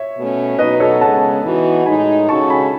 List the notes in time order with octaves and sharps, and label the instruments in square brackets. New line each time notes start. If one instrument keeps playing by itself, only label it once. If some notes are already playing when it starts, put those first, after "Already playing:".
Already playing: [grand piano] C#5 E5
[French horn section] B2 A3 C#4
[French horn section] B2 F#3 B3 D#4 [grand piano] B4 D#5
[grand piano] A4 C#5
[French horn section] C#3 G#3 B3 [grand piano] F#5 A5
[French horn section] E3 B3 D#4 F#4
[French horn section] A2 G#3 D#4 [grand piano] G#5 B5
[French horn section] C#3 G#3 D#4 F#4 A4 [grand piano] A5 C#6
[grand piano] G#5 B5